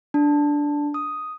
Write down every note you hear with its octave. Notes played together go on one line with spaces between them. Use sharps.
D4
D#6